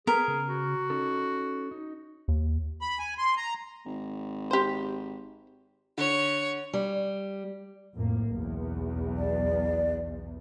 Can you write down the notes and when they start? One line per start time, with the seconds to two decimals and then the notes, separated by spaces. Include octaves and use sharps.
0.07 B3 G#4 A#4 B4
0.28 C#3
0.48 F#4
0.90 C#4 D#4 A4
1.71 D#4
2.28 D#2
2.81 B5
2.99 G#5
3.18 C6
3.37 A#5
3.86 G#1
4.51 G4 C5
5.98 D3 C#5
6.73 G3
7.95 F2 A2 A#3
8.29 B1 E2
9.17 D5